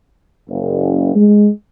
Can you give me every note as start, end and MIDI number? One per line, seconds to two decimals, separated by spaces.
0.49 1.15 30
1.15 1.48 56